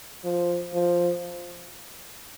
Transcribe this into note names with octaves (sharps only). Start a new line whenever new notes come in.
F3
F3